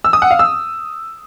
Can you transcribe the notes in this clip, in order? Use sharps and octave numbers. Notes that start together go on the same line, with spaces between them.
E6
D#6
F#5
F5
E6